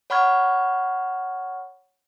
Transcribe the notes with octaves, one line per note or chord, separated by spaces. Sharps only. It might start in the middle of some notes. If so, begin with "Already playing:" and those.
C#5 F#5 B5 C#6 F6 G#6